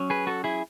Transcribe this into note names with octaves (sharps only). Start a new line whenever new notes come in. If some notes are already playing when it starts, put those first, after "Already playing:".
Already playing: F#3 C#4
G#4 B4
F#4 A4
E4 G#4